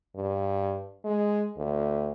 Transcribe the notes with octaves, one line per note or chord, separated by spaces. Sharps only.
G2
G#3
D2